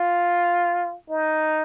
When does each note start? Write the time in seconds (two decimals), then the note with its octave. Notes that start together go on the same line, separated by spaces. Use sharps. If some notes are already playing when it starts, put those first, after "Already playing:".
Already playing: F4
1.09 D#4